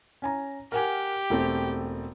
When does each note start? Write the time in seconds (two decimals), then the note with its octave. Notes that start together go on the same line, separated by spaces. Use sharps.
0.22 C#4 G#5 A#5
0.72 G4 A#4 F#5 G#5
1.30 E1 A3 C4